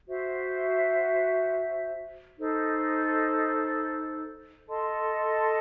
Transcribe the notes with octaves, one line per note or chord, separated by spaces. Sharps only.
F#4 C5 E5
D#4 A4 C5
A4 D#5 A5 C6